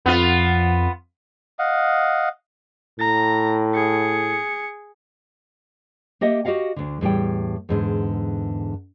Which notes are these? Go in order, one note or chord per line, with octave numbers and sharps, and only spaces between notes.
F2 B3 F4
D#5 F5 F#5
A2 A#5
G#4 C#7
A#3 G4 D#5 E5 F#5
F#4 G4 D#5 F5 F#5
D2 D3
E2 A2 G3 G5
E2 G#2 D3